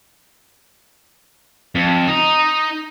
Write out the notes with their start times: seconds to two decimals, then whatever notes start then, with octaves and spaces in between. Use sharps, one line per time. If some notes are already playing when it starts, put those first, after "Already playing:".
1.75 F2
2.07 D#4